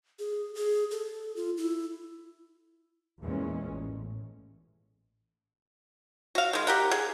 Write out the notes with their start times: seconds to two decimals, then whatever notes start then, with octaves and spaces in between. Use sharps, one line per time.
0.19 G#4
0.55 G#4
0.91 A4
1.36 F4
1.57 E4
3.21 E2 A#2 E3 G#3 C#4
3.66 A1
6.35 F#4 F5
6.53 D#3 G#3
6.67 G4 A#4 F#5
6.91 G#4